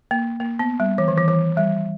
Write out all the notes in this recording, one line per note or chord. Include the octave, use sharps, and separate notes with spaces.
A#3
A#3
B3
G3
E3
D#3
E3
E3
G3